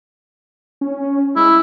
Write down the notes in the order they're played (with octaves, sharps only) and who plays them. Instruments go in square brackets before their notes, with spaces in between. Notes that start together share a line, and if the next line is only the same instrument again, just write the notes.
[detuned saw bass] C#4
[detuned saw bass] G#3 [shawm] E4